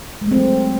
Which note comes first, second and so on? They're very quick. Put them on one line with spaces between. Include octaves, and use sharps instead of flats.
G#3 A3 C4 F#3